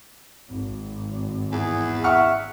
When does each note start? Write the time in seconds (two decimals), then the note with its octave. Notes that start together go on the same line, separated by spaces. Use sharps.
0.49 G#1
1.52 E2 G#4
2.04 E5 F#5 C#6 F6